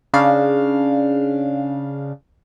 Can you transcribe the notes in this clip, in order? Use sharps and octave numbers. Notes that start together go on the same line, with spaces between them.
C#3 D4 F5